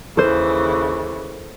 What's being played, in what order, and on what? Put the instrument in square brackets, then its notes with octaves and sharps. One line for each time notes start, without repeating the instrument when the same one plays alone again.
[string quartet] D#2 C#3 E3 [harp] A4 C5